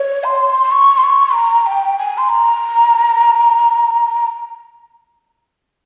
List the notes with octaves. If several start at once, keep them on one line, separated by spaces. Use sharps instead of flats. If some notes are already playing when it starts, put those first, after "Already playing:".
Already playing: C#5
C6
C6
C#6
C6
C#6
A#5
G5
G#5
C6
A#5